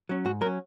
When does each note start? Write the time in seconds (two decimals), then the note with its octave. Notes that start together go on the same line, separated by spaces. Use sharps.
0.09 F#3 C#4
0.25 G#2 F#4
0.41 F#3 A#4
0.46 C#4